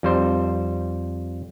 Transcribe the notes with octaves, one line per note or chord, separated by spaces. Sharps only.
F2 G3 C5